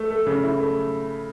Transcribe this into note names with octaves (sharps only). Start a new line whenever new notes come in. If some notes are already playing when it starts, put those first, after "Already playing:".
Already playing: A3
A3
C#3
E4
A3